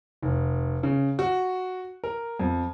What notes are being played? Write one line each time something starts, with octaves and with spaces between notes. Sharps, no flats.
F1
C#3
F#4
A#4
F2